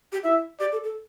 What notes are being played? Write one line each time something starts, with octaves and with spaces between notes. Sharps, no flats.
G4
E4 E5
G4 D5
A4
A4